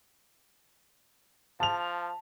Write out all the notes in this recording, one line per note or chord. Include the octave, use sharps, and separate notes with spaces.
F3 A5 F7